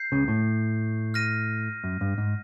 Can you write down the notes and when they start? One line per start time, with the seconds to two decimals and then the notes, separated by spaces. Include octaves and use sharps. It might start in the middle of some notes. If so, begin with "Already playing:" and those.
Already playing: G6 C7
0.12 C#2 C#3
0.28 A2
1.14 F6 A#6 D#7
1.84 F#2
2.01 G2
2.18 G#2